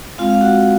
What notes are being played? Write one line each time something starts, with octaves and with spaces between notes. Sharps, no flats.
G#3 C4 F4 F5
F5
F#4 F#5